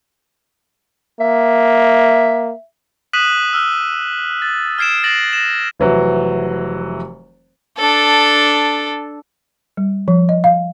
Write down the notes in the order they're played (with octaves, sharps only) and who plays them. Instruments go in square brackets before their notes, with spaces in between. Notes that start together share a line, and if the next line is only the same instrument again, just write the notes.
[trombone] A#3 [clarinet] E5
[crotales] D#6 F#6 B6 D#7 E7 F#7
E6 F6
A6
F6 G#6 C7 D7 E7
A6 A#6 C7 D7 F#7
A#6 E7
[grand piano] F1 E3 F#3
[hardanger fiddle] D4 A4
[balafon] G3
F3
D#5
F5